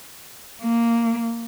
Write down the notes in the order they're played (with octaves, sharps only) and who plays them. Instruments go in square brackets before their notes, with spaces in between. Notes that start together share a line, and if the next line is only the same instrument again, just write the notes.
[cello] A#3